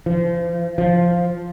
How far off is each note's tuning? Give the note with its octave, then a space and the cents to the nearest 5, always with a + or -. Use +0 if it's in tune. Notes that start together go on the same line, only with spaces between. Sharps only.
F3 -30
F3 +0